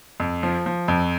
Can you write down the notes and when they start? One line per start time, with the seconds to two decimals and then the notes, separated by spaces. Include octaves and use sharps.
0.20 F2
0.43 F3
0.66 F3
0.88 F2